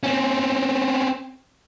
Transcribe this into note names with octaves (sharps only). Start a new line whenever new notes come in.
C4 C#4